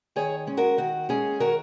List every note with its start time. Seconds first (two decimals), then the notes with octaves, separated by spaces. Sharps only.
0.16 D#3 G#4 C#5
0.47 G#3 C#4
0.57 F#4 A#4
0.77 D#3 F#4
1.09 G#3 C#4 G#4
1.40 D#3 F#4 A#4